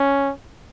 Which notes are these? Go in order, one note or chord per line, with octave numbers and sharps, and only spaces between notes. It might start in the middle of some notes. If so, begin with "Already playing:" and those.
Already playing: C#4